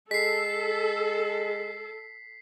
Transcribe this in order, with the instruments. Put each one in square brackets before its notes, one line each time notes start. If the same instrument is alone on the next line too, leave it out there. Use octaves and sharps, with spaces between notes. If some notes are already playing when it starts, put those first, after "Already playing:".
[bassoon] G#3 [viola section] A4 [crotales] B6 C7